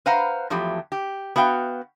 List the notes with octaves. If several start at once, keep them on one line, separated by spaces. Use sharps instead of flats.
B4 C5 F5 F#5 A#5
E2 F3 F#3 A3 G4
G4
B3 F#4 F5 G5